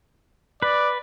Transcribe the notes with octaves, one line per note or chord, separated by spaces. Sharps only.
B4 D5